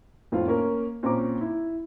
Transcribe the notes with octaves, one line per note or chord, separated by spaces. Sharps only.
F2 A2 C4 F4
A#3 C#4 A#4
A#2 C4 C#4 A#5 D6
E4